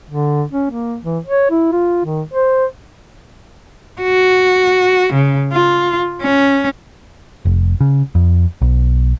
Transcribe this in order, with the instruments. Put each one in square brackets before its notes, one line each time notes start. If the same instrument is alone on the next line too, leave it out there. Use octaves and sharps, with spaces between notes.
[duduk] D3
C#4
A#3
E3
C#5
E4
F4
D#3
C5
[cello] F#4
C#3
F4
C#4
[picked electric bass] F1
C#3
F2
B1